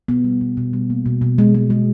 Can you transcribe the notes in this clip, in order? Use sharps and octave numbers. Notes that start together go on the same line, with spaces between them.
B2 B3
G3
B2
B2
G3
A#3
B2
B2
G#3
G#3
G#3